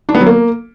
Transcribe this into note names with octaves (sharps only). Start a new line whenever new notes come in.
D4
B3
F#3
A#3